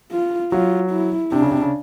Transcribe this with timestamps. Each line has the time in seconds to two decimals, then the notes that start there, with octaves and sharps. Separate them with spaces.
0.12 F4
0.52 F#3 F4
0.91 E4
1.32 C3 D4
1.42 C#3
1.51 C3
1.62 C#3